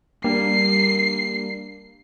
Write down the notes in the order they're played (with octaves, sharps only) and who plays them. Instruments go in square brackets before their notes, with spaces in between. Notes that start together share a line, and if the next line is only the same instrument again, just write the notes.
[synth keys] G3 A#3 D4 [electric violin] C7